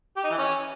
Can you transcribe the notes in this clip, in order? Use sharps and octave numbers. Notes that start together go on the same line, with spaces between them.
G4
D#4
E3
C#4